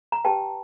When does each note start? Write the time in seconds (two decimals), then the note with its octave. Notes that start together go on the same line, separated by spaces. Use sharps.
0.12 A#5
0.25 G4 B4 G5 A5